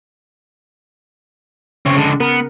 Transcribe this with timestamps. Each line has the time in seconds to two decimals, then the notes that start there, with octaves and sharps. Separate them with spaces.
1.86 C#3 C4 C#5
1.97 D3 G#3
2.20 B3 A#4